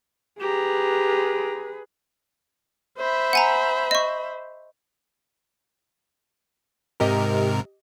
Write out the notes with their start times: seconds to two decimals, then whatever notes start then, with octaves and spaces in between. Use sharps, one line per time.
0.41 G4 G#4 B4 A#5
2.97 C5 E5 B5
3.33 F#5 G#5 A#5
3.91 D#5 C#6
7.00 G#2 C3 G4 A#4 D#5